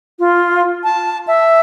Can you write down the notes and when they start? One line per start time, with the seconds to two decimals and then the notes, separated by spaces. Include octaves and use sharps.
0.19 F4
0.84 A5
1.27 E5